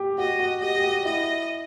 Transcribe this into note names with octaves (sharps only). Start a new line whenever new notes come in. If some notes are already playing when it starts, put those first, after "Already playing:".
Already playing: G4
F#4 D#5
F#4
G4 D#5
G4
F#4
E4 D#5